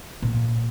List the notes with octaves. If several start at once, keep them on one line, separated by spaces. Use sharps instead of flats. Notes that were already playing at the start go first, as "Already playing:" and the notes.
A#2